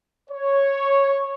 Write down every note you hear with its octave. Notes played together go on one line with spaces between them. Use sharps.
C#5